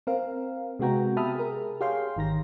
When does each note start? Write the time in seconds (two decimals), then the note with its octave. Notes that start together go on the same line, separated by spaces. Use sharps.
0.07 C4 A#4 F5
0.79 C3 G#3 B3 F#4 G5 A#5
1.16 G4 E5 A5 B5 D#6 F6
1.35 G#4 A#4
1.81 G4 G#4 C#5 F5 G5 C6
2.16 G#1 D#3 A#5 A#6